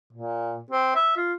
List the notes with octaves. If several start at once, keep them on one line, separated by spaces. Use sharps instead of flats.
A#2
C4
E5
F4